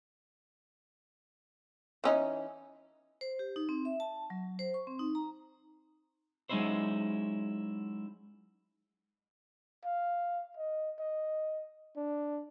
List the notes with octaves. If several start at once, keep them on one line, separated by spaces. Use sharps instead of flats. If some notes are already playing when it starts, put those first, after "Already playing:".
E3 C#4 D#4
C5
G4
D#4
C4
E5
A5
F#3
C5
C#6
C4
D#4
A#5
F#3 G#3 C#4 D#4 E4 C5
F5
D#5
D#5
D4